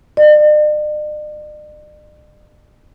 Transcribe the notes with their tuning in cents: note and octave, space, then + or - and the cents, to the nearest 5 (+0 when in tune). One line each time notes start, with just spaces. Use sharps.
D5 +45